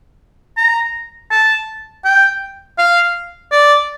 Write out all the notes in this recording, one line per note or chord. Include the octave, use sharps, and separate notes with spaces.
A#5
A5
G5
F5
D5